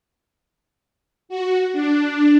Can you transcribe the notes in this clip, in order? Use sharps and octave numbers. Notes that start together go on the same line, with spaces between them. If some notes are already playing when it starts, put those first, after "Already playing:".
F#4
D4